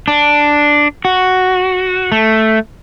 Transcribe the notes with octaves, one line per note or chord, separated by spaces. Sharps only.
D4
F#4
A3